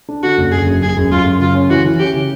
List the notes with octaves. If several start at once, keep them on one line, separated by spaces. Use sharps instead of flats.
D4
D3 F#4
F#1
F#1 G#4
F#2
F#2 G#4
F#2
F#2 F4
F#2
C#3 F4
C#4
E3 F#4
E3
C#4 G4
C#3